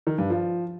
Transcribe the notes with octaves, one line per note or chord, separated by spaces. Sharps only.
D#3
G2
F3